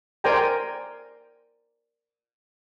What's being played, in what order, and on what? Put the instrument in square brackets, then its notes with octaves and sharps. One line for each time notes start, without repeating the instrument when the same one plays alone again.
[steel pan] A#4 C5 D5 G5 G#5 A#5